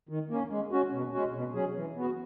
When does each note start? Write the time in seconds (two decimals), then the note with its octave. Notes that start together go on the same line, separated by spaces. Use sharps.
0.09 D#3
0.30 A#3 C#4
0.50 G#3
0.71 C#4 F#4
0.92 B2
1.14 G#3 C#4 F#4
1.34 B2
1.54 F#3 C#4 G#4
1.76 E3
1.96 B3 F#4